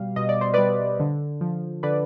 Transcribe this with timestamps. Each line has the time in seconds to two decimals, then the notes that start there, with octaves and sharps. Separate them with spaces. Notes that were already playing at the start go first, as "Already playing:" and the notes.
Already playing: B2 G3 F5
0.16 B2 D#5
0.29 D5
0.41 C5
0.54 G3 B4 D5
1.00 D3
1.41 F3
1.83 D3 B4 D5